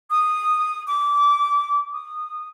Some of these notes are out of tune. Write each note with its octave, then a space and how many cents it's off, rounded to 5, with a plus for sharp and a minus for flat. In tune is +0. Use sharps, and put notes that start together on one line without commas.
D#6 -10
D6 -20
D#6 -20